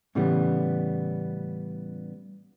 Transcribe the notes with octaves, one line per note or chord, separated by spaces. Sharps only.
A2 C#3 E3 G3 B3